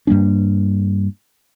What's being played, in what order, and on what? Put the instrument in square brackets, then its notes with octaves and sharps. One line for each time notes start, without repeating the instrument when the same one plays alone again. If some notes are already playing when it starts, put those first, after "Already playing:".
[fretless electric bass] G2 G3 A#3 D4